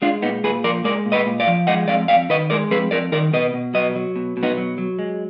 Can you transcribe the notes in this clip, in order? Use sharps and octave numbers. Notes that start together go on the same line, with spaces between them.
G#3 D4 F4
A#2 B3 D#4
A#2 G#4 B4
F3 A#4 D5
G#3 A#4 D5
A#2
B4 D#5
A#2
D5 F5
F3
G#3 D#5 F#5
F2 D5 F5
F2 D5 F5
D#3 B4 D#5
G#3 A#4 D5
F2 G#4 B4
F2 A#4 D5
D#3 A#4 D5
B2 B4 D#5
B2
F#3 B4 D#5
F#3
B2
B2
B3 D#4
F#3
F#3
G#3